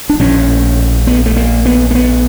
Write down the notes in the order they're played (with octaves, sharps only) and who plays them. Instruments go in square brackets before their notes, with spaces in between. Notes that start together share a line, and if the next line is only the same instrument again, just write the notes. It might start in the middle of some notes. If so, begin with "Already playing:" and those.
[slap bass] D4
A#1 A2 C#4
B3
A3
A#3
B3
A#3
B3